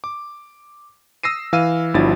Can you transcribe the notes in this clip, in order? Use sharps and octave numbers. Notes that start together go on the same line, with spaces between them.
D6
D#6 E6 A#6 C7 D#7
E3 F5 E6 F6 D#7
G1 F3 D4 E4 F#4 A6